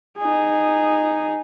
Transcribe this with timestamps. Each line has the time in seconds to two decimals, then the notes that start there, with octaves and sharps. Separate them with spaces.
0.18 D#4 G#4